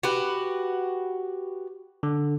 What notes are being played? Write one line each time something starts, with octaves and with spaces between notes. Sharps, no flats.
F#4 G4 B4
D3